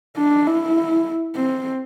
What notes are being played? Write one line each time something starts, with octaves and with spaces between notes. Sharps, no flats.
D4
E4
C4